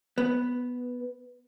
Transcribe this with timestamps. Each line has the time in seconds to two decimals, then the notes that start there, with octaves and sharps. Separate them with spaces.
0.18 B3